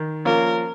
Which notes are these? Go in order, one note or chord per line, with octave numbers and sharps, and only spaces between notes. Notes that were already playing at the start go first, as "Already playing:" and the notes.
Already playing: D#3
F3 A#3 C#4 F4 A#4